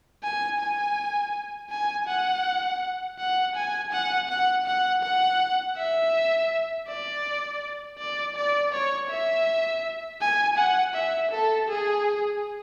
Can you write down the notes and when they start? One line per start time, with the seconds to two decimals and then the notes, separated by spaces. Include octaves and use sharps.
0.23 G#5
0.60 G#5
1.71 G#5
2.08 F#5
3.19 F#5
3.55 G#5
3.93 F#5
4.29 F#5
4.66 F#5
5.03 F#5
5.77 E5
6.88 D5
7.99 D5
8.36 D5
8.73 C#5
9.10 E5
10.21 G#5
10.58 F#5
10.94 E5
11.31 A4
11.69 G#4